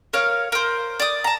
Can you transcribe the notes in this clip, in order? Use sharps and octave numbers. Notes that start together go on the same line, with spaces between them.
A#4 C#5 F5
A#4 C5
D5 D#6
A5 A#5